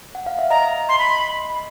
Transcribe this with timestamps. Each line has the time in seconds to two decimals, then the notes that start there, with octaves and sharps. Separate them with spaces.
0.15 F#5
0.26 F5
0.39 E5
0.50 D#5 A#5
0.89 C6
0.99 B5